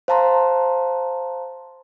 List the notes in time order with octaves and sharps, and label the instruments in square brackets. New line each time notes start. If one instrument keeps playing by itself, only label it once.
[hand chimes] C5 F5 A5 A#5 C6